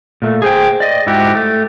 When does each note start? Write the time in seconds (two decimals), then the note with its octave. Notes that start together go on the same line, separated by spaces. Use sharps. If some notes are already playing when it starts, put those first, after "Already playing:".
0.22 A#2 A3
0.42 G#4 C5 G5
0.80 D5 D#5
1.07 G#2 E4 F#4 G4
1.35 A3